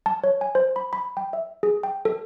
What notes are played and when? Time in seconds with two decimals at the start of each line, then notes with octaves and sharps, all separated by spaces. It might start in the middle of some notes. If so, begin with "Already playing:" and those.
0.06 A5
0.24 C#5
0.41 G#5
0.55 C5
0.76 B5
0.93 B5
1.17 G5
1.33 E5
1.63 G#4
1.83 G5
2.05 A4